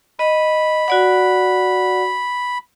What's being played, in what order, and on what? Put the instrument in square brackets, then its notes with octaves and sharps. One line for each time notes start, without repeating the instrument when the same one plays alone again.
[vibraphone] D#5 [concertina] B5
[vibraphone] F#4 D5 F#5